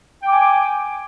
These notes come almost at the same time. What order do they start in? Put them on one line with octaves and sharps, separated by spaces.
G5 D6 G#5